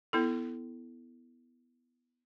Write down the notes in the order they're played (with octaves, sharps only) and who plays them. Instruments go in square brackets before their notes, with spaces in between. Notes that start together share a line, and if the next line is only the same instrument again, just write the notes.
[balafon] B3 E4 A4